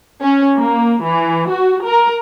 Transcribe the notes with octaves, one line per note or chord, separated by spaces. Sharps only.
C#4
A#3
E3
F#4
A#4